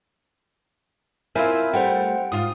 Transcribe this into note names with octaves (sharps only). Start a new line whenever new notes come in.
C4 E4 F4 A#4 E5 G#5
G3 A3 C5 F#5 G5
G#2 F4 D#6